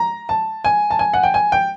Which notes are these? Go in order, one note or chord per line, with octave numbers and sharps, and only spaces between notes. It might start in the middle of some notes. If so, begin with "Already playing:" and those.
Already playing: A#5
A5
G#5
A5
G#5
F#5
G5
G#5
G5